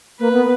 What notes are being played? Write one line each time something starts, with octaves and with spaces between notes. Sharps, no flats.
A#3 B4
B3